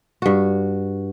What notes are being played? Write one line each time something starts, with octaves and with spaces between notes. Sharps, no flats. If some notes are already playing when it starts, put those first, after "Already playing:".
G2 F#4